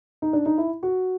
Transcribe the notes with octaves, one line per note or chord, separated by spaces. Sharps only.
D#4
D4
D#4
E4
F#4